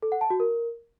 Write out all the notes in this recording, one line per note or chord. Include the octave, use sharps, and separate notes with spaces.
A4
F#5
A5
F#4
A#4